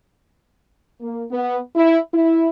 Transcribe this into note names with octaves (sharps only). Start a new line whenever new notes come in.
A#3
B3
E4
E4